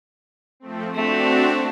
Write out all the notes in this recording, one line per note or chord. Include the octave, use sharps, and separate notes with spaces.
F3 A3 C4
A3 C4 D4 F#4